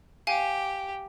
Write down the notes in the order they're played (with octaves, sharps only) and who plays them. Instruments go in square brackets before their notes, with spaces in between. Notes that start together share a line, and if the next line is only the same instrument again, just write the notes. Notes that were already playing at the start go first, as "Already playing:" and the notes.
[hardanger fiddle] G4 [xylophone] F5 G#5